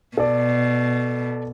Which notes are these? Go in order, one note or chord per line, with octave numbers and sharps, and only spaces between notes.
B2 A4 D5